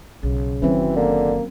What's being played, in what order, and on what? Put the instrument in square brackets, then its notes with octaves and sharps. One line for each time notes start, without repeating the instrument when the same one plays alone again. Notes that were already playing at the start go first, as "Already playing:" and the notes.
[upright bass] B1 [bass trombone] C#3
[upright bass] F#1 D#3 [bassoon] E3 [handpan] F#3 C4 C#4
[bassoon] D3 [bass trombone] A#3